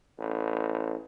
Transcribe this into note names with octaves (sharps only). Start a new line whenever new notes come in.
A1